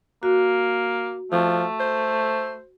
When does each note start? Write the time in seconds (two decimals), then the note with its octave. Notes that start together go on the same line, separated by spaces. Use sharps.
0.23 A#3 F#4
1.32 F3 A3
1.80 C5